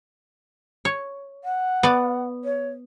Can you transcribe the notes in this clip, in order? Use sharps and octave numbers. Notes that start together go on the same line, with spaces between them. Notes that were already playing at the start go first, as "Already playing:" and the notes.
C#5
F#5
B3 D5
C#5